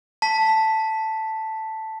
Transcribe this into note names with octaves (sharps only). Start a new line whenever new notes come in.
A5 B6